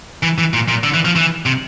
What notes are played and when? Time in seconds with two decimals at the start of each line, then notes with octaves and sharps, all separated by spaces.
0.23 E3
0.38 E3
0.54 A#2
0.69 A#2
0.83 D3
0.94 E3
1.05 F3
1.16 E3
1.46 C3